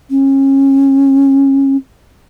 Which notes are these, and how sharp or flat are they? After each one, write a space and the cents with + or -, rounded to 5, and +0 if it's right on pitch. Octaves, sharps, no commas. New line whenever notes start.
C#4 -25